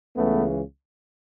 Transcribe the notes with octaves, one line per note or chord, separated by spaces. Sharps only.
C#2 C#3 E3 A3 B3